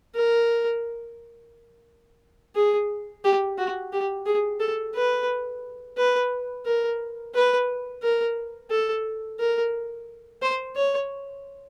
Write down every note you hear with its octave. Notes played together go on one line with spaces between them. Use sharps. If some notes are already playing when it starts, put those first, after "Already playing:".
A#4
G#4
G4
F#4
G4
G#4
A4
B4
B4
A#4
B4
A#4
A4
A#4
C5
C#5